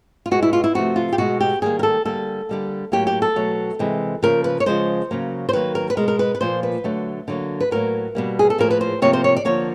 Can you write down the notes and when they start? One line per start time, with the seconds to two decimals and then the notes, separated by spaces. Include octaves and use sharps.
0.26 F4
0.31 B2 G#3 F#4
0.43 E4
0.53 F4
0.64 E4
0.75 C3 F3 A3 F#4
0.96 F4
1.13 G4
1.18 B2 G#3 F#4
1.41 G4
1.62 D#3 G3 A#3 G#4
1.79 A#4
1.83 A4
2.05 D3 G3 A#3 A4
2.49 D3 G3 A#3
2.92 A2 F#3 A#3 G4
3.07 G4
3.22 A4
3.36 B2 F#3 A3
3.79 C3 E3 G#3
4.23 C#3 F3 A#3 A#4
4.44 B4
4.60 C#5
4.66 C#3 F3 G#3 C5
5.11 C#3 F#3 A#3
5.49 C5
5.53 D#3 F#3 A#3 B4
5.75 A#4
5.90 B4
5.97 B2 G#3 A#4
6.08 A#4
6.19 B4
6.35 B4
6.41 A#2 F3 A#3 C5
6.63 B4
6.84 D3 F#3 A3
7.28 D3 F#3 A#3
7.60 B4
7.71 A2 F#3 A#3 A#4
8.15 B2 G3 A#3
8.39 G#4
8.50 A4
8.58 A2 F3 A#3 A#4
8.71 B4
8.81 C5
9.02 C3 F3 A#3 C#5
9.13 C5
9.24 C#5
9.36 D5
9.45 D3 F3 A#3 C#5